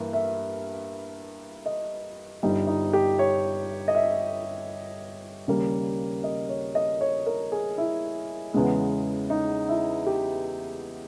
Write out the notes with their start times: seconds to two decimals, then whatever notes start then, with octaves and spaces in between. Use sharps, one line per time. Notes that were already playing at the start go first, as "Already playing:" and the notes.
Already playing: G2 E3 A#3
0.13 E5
1.66 D#5
2.43 G1 G2 G3 D#4
2.67 D#4
2.93 G4
3.19 C#5
3.88 D#5
3.95 E5
5.48 D#2 C#3 G3 A#3
6.24 D#5
6.49 C#5
6.75 D#5
7.01 C#5
7.26 A#4
7.52 G#4
7.78 E4
8.54 E2 C#3 G#3 B3
9.30 D#4
9.68 E4
10.06 G4